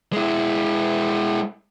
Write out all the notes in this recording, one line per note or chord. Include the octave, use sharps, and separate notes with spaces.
G#3 E4